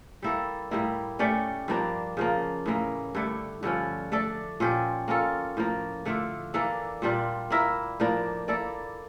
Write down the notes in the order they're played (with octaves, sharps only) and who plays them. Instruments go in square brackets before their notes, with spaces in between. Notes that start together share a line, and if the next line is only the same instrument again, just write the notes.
[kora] G3 A#3 E4 A4
A2 G3 A#3 E4
A3 C#4 G4 D5
G2 F3 A#3 D4
C#3 F3 A#3
A2 E3 A#3
G2 D3 A3 D4
G2 D3 F3 C#4
A3 D4 A4 D5
A#2 F3 C#4 G4
A#3 C#4 F4 A4
A2 F3 A#3
D3 A3 D4 F4
E3 A#3 D4 A4
A#2 G3 D4 F4
A#3 E4 A#4 E5
A2 F3 A#3 D4
A#3 E4 A4 D5